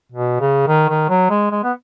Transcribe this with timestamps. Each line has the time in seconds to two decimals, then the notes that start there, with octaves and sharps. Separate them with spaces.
0.12 B2
0.41 C#3
0.68 D#3
0.89 D#3
1.09 F#3
1.30 G#3
1.51 G#3
1.64 B3